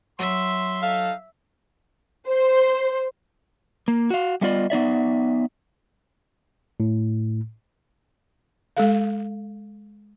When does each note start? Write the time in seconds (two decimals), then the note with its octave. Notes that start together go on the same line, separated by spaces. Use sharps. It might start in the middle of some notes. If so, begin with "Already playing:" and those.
0.19 F#3 E5 C6
0.82 D#4 A4 F5
2.27 C5
3.88 A#3
4.10 F#4 F5
4.41 G3 A3 B3 F4 D5 D#5
4.70 B3 D#4 D5 E5
6.80 A2
8.77 G#3 A4 F5